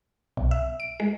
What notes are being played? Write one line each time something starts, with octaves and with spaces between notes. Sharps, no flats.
B1
E5
D7
G#3